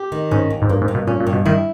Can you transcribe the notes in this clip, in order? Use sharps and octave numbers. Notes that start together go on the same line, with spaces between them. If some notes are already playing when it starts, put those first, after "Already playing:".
Already playing: G4
D#3
G#2 C#4
D#2
G#2
G2 A#3
G#2
G2
B2
A#2 C#4
A#2
G2
B2
D#3 E4